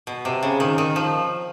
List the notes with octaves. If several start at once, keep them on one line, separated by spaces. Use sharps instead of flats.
B2
C3
C#3
D#3
D#3
F3